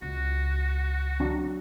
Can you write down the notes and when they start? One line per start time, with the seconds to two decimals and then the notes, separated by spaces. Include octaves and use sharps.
0.02 C#2 F#4
1.20 F#3 D4